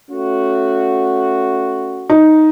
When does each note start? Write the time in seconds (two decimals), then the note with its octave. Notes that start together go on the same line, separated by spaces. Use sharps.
0.11 A3 C#4 F#4
2.10 D#4